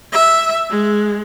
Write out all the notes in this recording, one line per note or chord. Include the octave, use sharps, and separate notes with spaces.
E5
G#3